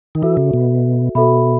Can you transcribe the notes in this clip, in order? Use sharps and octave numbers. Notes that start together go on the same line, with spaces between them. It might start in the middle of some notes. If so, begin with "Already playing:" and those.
D#3
E3 F#4 A4 E5
C#3
B2
B2 F#4 A4 E5 B5